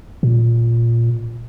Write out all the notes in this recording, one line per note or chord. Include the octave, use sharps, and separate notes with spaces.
A#2